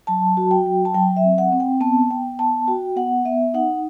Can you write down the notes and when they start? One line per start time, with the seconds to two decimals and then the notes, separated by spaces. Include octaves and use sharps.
0.07 F#3 A5
0.37 F#4
0.51 G5
0.66 F#3
0.85 A5
0.94 F#3 G5
1.16 E5
1.24 C4
1.38 F#5
1.52 C4
1.60 G5
1.81 B3 A5
2.11 B3 G5
2.39 B3 A5
2.68 F#4 G5
2.96 B3 F#5
3.25 B3 E5
3.54 D#4 F#5